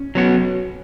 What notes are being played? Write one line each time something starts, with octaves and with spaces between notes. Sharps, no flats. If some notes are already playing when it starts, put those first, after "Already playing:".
Already playing: C#4
F#3 B3 F#4